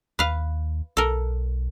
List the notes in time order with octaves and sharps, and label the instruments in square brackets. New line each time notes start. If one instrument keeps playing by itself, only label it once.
[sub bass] D#2 [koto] B4 F5
[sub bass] B1 [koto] A4 A#4